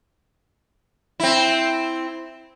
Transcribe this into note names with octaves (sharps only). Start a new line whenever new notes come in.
C4 E4